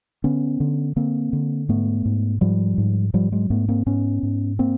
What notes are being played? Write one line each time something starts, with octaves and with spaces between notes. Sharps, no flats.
D3 B3 C#4
D3
D3 A#3 C4
D3
G#2 A3 B3
G#2
G#2 F3 G3
G#2
G#2 F3 G3
F#3 G#3
G#2 A3 B3
A#3 C4
G#2 B3 C#4
G#2
A#3 C4